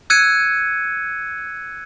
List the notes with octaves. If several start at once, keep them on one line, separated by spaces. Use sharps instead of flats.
E6 F#6 G#6 C#7 D#7